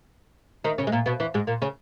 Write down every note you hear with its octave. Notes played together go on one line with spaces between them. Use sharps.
D#3 D#4
C#3 C#4
G#3
A#2 A#3
B2 B3
E2 E3
G#2 G#3
A#2 A#3
C#3 C#4